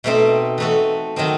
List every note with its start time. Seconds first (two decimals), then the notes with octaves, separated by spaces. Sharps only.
0.04 B2 A3 C4 D#4
0.58 E3 A3 D#4 F#4 A4
1.16 D#3 F#3 C4 D#4